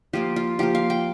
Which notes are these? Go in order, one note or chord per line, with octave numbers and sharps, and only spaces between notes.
F3 A#3 F4 G4
F4
F3 A#3 F4 G4
F5
G5